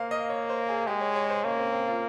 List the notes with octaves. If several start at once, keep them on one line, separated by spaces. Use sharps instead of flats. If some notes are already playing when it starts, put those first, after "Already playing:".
Already playing: A#3 C5 F5
D#5
C#5
C5
G#4
G#3 G4
C#5
C#5
C5
A#3 C#4
C4
C4
F4